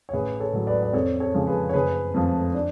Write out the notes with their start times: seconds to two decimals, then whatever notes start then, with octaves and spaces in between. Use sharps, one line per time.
0.09 C#5
0.13 A1 G#4 B4
0.40 A4 C#5
0.53 A2 F#3
0.67 B4 D5
0.83 D5
0.93 F2 A4 C#5
1.20 A4 C#5
1.34 C#3 F3 G#3
1.47 G#4 B4
1.69 C#5
1.73 F#1 G#4 B4
2.14 F2 F3 A3
2.54 D4